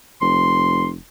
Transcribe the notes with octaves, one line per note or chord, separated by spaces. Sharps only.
F1 C6